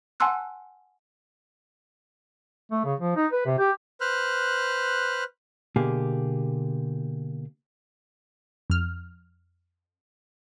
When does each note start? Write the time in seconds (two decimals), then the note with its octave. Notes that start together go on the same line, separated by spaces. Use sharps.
0.20 F#5 G#5 A5 C6 E6 F#6
2.71 A3
2.84 C#3
3.00 F3
3.16 D#4
3.32 B4
3.46 C3
3.59 G4
4.01 B4 C5 F6 F#6
5.76 B2 D3 A#3 G4 G#4
8.70 F2 F6